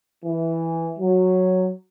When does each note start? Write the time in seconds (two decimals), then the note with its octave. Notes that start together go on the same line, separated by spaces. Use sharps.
0.25 E3
0.99 F#3